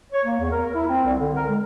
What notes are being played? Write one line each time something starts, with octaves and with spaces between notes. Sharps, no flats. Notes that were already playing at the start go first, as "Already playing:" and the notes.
C#5
A#3
E2
A#4
E4
C4
C2
D3
A#4
G#3